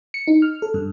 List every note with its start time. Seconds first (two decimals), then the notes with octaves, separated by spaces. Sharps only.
0.14 C#7
0.28 D#4
0.42 F6
0.62 A4
0.74 G2